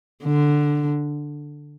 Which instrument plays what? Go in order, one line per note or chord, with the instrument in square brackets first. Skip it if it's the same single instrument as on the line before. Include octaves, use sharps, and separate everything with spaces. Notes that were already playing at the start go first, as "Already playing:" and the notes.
[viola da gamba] D3